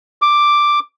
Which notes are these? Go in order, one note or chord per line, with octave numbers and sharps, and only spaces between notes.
D6